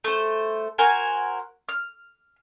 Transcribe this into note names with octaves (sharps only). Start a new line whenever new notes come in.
A3 C5
F#4 A#4 C5 G#5
F6